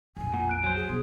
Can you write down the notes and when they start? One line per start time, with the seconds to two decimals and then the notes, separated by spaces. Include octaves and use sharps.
0.17 A#1 F2 G#5
0.34 A#2 F#5
0.49 F#6 D7
0.64 F#3 C5
0.75 G#4
0.89 E1